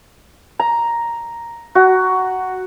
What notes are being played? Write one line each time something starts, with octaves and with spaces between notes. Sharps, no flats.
A#5
F#4